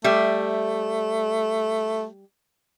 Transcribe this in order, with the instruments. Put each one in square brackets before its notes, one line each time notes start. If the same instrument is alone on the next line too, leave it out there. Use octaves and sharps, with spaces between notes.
[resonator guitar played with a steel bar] G3 E5 [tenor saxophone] A3